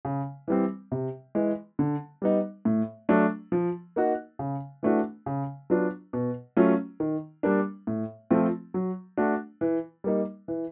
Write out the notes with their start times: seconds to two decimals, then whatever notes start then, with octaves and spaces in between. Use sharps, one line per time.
0.05 C#3
0.48 E3 G3 C4
0.92 C3
1.35 E3 G#3
1.79 D3
2.22 G3 B3 D#4
2.65 A2
3.09 F#3 A3 D4
3.52 F3
3.96 A#3 D#4 F#4
4.39 C#3
4.83 E3 A3 D4 F#4
5.26 C#3
5.70 F#3 B3 D4 F4
6.13 B2
6.57 F#3 A3 C#4 F4
7.00 D#3
7.43 G3 A#3 D4
7.87 A2
8.30 F3 A3 C4 F4
8.74 F#3
9.17 A3 D4 F#4
9.61 E3
10.04 G3 A#3 D#4
10.48 E3